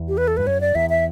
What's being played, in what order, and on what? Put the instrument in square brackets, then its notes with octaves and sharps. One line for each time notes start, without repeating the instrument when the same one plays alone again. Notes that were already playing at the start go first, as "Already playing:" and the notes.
Already playing: [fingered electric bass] E2
[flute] G4
B4
A4
[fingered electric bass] G2 [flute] B4
[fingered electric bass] F#2 [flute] C#5
[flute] D5
[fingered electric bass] E2 [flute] E5
[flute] E5